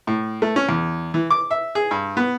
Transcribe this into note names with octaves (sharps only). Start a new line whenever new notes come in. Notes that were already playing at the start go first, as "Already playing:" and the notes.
A2
A3
C#4
E2
E3
D6
E5
G#4
G2
B3